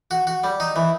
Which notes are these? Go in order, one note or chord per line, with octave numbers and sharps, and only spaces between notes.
F#4
F#4
G3
D#4
E3